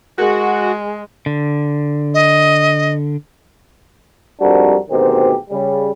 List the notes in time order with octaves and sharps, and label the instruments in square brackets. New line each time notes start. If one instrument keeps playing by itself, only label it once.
[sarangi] G#3 [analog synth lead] F#4 [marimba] G#4 A#4 F#6
[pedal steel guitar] D3
[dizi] D#5
[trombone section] F2 G#2 G3 D4 F#4 A#4
D2 G#2 B2 D#3 C4 G4
C#3 G3